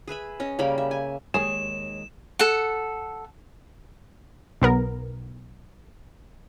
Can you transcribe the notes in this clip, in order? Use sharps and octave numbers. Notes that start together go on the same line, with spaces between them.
G#4 B4 E5 B5
C#4 D#5
C#3 G3 A#3 B5
E5
G#5
D#2 D#3 G3 G#3 G#4 C#5 E7
A4 F#5
B1 B3 A#4